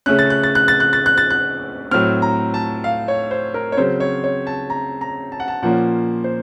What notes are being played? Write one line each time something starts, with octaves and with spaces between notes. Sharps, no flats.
C#3 A3 C#4 F#6
A6
F#6
A6
F#6
A6
F#6
A6
F#6
A6
F#6
A2 F#3 C4 F6
A#5
A5
F5
C#5
C5
A#4
C#5
C#3 F#3 C4 C5
C#5
C#5
A5
A#5
A#5
A5
F#5
A5
A#2 F3 A#3 C#4 F#5
C5